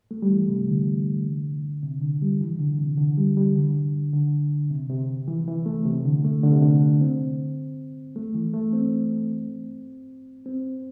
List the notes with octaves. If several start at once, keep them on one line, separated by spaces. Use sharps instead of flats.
A3
G3
E3
C3
D3
C3
D3
G3
E3
D3
C3
D3
G3
G3
D3
D3
C3
C3
E3
E3
A3
C3
D3
A3
D3
C3
D3
C4
A3
E3
A3
C4
C4